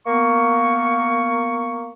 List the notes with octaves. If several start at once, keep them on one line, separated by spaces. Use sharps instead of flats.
A#3 B3 C#6